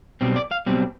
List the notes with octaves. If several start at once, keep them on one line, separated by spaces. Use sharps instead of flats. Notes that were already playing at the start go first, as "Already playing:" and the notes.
B1 B2 G3 C4
D5
F5
B1 B2 G3 C4